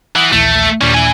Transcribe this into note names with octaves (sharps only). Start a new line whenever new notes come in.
E3 F#5 D#6
A#1 D#2 E3 A3
D#2 A#2 G3 C#4 D4
E4 G#5